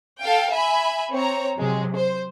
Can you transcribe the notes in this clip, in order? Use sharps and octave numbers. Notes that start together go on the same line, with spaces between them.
A4 F5 G5
E5 G#5 B5
C4 C#5 A#5
C3 F#3 G#3
C5